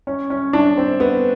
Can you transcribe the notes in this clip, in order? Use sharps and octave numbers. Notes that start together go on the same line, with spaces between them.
C#4
C#4
D4
C4
B3